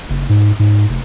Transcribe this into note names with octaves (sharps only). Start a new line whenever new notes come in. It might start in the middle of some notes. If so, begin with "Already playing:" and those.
F#1
G#2
G#2
F1